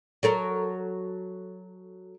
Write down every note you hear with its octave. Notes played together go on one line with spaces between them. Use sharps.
F#3 A4 A#4